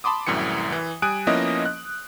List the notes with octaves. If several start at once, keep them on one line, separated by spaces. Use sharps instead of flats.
A5 B5 C6 D6 D#6
C2 F#2 A2 E3 C#7
E3
G3 G#5 D#6 F#6 D7
F3 A#3 B3 C#4 E4 D#5
F#6